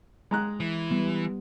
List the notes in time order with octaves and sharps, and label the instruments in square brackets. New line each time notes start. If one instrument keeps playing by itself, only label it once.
[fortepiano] G#3 A#5 F#6
[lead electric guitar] E3
[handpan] G3 B3